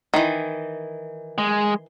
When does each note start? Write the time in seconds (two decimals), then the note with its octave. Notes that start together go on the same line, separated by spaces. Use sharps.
0.14 D#3 E3
1.38 G#3